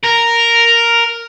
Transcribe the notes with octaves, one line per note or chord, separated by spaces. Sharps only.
A#4